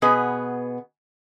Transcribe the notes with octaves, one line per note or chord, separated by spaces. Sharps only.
B2 B3 G#4